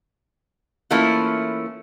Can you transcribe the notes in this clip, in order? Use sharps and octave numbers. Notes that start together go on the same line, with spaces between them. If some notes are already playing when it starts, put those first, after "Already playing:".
E3 A3 A#3 C#4 E4 F4